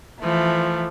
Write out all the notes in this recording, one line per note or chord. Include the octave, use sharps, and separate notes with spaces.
E3 F3 A3